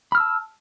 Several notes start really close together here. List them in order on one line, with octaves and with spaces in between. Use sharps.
B5 F6 E6 A5